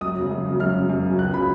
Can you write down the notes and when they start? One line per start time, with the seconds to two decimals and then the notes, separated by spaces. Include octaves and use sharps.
0.01 F#2 D#6
0.16 F#3
0.21 C#3
0.31 F#2
0.46 C#3 F#3
0.60 F#2 F6
0.75 C#3 F#3
0.89 F#2
1.04 C#3 F#3
1.18 C#2 F#6
1.33 C#3 F#3 B5